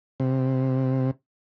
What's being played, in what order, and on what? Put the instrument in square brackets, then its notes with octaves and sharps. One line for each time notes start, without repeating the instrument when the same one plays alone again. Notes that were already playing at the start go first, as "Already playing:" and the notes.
[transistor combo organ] C3